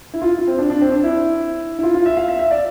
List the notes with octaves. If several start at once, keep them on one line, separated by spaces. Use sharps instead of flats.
E4
F4
F4
C4
D4
D4
C4
D4
E4
E4
F4
F4
E5
F5
E5
E5
D5